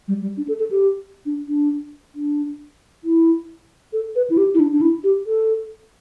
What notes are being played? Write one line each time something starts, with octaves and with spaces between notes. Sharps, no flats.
G3
G3
D4
A4
A4
G4
D4
D4
D4
E4
A4
B4
E4
G4
E4
D4
D4
E4
G4
A4